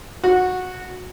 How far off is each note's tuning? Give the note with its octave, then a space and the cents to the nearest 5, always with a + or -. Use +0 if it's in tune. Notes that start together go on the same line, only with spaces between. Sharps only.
F#4 -15